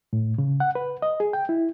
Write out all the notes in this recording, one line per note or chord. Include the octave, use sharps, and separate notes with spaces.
A2
C#3
F#5
B4
D#5
G#4
G5
E4